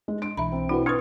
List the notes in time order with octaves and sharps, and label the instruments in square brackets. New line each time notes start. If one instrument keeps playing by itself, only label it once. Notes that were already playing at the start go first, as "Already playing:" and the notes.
[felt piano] G#3
[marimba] D4 [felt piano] D7
[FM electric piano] B1 E3 [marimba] E5 A#5 B5
[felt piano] C4
[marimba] B2 E4 [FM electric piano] D4 F#4 B4
[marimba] D4 B4 [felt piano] C#6 D#6 G#6 [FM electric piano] F6